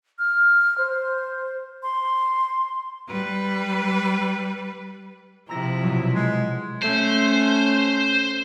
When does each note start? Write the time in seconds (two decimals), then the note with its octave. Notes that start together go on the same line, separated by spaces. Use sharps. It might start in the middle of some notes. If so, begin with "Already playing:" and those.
0.19 F6
0.78 C5
1.83 C6
3.08 G3 B4
5.49 C3 F3 E4 A#5 E6 A#6
5.83 B2 F#3
6.13 G#3
6.82 A3 C#4 C5